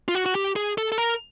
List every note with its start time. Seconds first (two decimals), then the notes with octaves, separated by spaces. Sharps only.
0.08 F4
0.15 F#4
0.26 F#4
0.35 G4
0.56 G#4
0.78 A4
0.92 A4
0.98 A#4